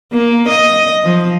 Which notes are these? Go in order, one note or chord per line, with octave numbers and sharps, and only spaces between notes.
A#3
D#5
F3